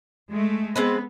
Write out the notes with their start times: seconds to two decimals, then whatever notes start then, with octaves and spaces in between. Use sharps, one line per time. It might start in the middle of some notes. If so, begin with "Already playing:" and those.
0.30 G#3 A3
0.76 G#3 B3 C4 B4